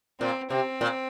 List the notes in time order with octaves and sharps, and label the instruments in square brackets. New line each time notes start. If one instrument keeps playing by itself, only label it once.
[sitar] A#2 [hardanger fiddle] C4
[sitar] C3 [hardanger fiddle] C4
[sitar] A#2